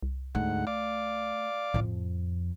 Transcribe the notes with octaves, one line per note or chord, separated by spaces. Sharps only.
C2
D2 G#2 A3 F#5
D5 F5 D6
F2 A2 F3